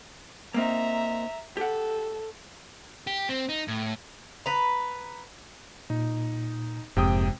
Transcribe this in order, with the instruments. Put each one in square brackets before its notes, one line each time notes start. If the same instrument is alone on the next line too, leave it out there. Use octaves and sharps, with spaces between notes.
[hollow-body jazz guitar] A#3 C4 D#4 [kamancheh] E5 A#5
[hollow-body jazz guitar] G4 F#5 [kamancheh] A4
[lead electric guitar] G4
C4
D#4
A2
[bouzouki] B4 A#5
[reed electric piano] A#2 [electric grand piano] D#4
[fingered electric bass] F1 G#2 [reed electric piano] F2 [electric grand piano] C3 G5 D#6